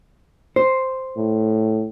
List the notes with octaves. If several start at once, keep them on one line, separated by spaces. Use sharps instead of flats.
C5
A2